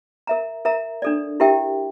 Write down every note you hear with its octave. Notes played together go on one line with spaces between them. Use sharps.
A#4 E5 A#5
A#4 E5 A#5
D4 A4 D5
E4 G4 A#4 E5 G5